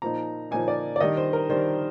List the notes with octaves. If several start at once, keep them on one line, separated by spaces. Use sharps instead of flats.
A#2 F3 A#3 D#4 A#5
A#2 F3 A#3 D#4 G#5
D5
D5
D#3 G3 D4 D#5
C5
A#4
D#3 G3 D4 C5